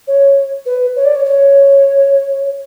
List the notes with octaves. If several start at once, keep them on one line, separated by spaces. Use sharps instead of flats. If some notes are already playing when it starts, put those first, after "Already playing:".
C#5
B4
C#5
D5
C#5
C#5